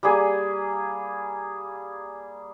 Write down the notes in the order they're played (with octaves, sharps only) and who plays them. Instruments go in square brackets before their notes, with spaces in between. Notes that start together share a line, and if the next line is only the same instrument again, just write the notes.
[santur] G3 A#3 G#4 G#5